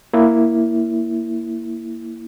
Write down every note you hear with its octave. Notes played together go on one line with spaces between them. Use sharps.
A#3 E4